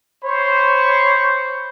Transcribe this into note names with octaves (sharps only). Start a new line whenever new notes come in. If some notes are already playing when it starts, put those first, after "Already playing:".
C5 C#5 B5 C#6